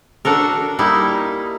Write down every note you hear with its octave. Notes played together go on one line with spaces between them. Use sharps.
D4 F#4 A4 A#4
G3 A#3 D#4 E4